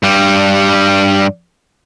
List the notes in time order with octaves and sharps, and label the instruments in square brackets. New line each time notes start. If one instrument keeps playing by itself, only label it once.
[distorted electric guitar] G2 G3